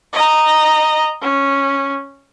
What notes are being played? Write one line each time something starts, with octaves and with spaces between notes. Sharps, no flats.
D#5 A#5
C#4